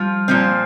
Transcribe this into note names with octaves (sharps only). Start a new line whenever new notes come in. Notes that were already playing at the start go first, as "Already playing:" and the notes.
Already playing: F3 G3 F4
A#2 F3 C4